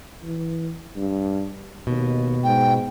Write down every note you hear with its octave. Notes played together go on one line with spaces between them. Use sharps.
E3
G2
D#2 B2
G#2 G5